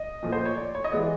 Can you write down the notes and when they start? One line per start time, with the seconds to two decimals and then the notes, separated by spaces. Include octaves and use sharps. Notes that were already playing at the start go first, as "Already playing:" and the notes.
Already playing: D#5
0.23 A#2 F3 A3
0.32 C5
0.45 C#5
0.57 D5
0.75 C#5
0.84 D#5
0.92 E3 G#3 B3 D5